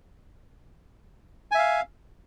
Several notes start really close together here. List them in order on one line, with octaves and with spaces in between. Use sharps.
G#5 E5 F5